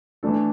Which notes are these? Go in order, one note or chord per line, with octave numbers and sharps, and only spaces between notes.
E3 A3 D4 A4